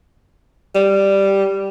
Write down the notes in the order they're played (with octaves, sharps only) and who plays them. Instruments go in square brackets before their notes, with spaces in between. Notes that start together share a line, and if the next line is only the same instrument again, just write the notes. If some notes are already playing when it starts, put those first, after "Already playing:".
[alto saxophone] G3